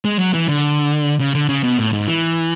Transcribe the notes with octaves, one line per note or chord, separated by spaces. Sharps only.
G#3
F#3
E3
D3
C#3
D3
C#3
B2
A2
G#2
E3